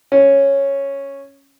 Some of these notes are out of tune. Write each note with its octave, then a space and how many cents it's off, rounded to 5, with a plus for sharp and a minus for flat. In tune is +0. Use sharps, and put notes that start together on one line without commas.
C#4 -5